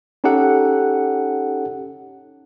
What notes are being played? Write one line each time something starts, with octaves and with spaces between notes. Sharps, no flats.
C#4 D#4 G4 A4 F#5